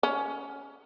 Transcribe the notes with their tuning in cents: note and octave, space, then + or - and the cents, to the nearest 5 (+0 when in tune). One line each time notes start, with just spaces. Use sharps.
C#4 +15